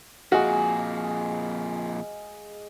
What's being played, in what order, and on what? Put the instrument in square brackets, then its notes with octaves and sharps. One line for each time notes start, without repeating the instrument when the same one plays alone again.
[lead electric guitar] F2 A#2 [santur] G#3 F5 [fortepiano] F#4